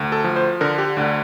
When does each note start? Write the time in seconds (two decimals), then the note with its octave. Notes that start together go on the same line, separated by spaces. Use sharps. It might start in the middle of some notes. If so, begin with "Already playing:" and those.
Already playing: D2
0.12 A4
0.24 F3
0.36 C5
0.61 D3 A#4
0.78 G4
0.97 D2 D4